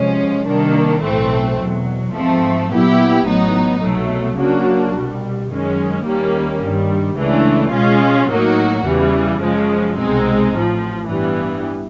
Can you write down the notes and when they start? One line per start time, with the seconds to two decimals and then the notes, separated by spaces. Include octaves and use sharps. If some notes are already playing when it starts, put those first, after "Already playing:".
Already playing: C3 F3 G#3 C#4
0.46 C3 D#3 G3 A#3 D4
1.02 B1 A2 E3 A3 C4
1.58 E2 B2 F#3
2.14 G#2 F3 A3 C4
2.70 A#2 F#3 B3 E4 G4
3.27 A1 A2 F#3 B3 D#4
3.82 C2 B2 F#3 A3
4.37 C#3 F#3 A#3 D4 F#4
4.94 C2 B2 G3
5.50 F#2 D#3 G#3 C#4
6.05 D#2 D#3 G3 A#3 C#4
6.61 G2 D#3 G3
7.17 C#2 C#3 E3 A3 D4
7.73 B2 G#3 C#4 F4
8.29 A2 F#3 A#3 D#4 F#4
8.85 E2 C#3 E3 G3
9.41 F#2 C#3 F3 G#3
9.97 C2 B2 G#3 C4 D#4
10.53 A1 A2 F3
11.08 G2 E3 G3 B3